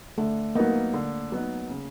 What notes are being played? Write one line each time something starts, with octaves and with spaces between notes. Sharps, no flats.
D3 A3
F#3 A#3 B3 D#4
D3
F#3 B3 D#4
C#3